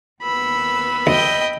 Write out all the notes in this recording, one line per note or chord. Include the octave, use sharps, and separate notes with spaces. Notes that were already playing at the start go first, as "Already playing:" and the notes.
D#2 B3 B5 E6
D2 D#5 G5